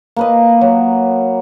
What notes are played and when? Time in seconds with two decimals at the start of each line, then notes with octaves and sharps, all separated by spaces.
0.16 A#3 B4 D#5
0.61 F#3